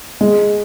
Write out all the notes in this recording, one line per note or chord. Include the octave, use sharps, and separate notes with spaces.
G#3